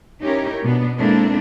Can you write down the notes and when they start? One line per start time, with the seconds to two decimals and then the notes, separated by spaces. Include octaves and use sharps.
0.22 C#4 D#4 E4 G4 A#4 C#5
0.63 B2 B3 D4
0.97 G#3 A#3 C4 D4 E4 A4